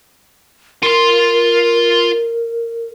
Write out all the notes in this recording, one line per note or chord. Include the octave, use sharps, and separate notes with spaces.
F4 A#4 C6